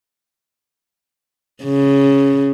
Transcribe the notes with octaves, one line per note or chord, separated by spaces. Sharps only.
C#3